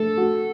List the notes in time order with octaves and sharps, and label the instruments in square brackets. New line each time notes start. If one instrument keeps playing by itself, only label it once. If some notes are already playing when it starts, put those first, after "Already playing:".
Already playing: [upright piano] A3 [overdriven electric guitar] A4
[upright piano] F#4